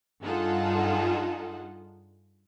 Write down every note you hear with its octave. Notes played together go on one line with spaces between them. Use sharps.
G2 D#4 F4 G#4 A4 F#5